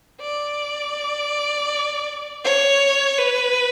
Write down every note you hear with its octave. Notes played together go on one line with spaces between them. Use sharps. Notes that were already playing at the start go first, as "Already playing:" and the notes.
D5
C#5
B4